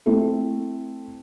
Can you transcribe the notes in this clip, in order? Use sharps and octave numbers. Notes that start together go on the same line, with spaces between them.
A3 C4 E4 A4